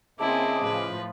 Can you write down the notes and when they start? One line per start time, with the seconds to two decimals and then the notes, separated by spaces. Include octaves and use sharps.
0.20 C#3 A#3 C4 E4 G#4 D#5 A5 D6
0.64 A2 F3 B4